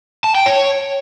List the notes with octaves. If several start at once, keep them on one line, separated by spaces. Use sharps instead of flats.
A5
G5
C#5